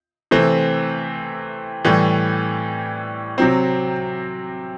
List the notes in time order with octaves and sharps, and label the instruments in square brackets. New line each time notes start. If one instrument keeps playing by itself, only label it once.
[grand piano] C3 E3 A3 C4
A2 E3 G3
C3 F#3 C4